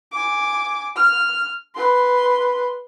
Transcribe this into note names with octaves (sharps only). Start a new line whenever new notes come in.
G#5 D6
F6
B4 C6